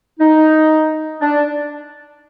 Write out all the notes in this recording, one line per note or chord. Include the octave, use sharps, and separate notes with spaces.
D#4
D4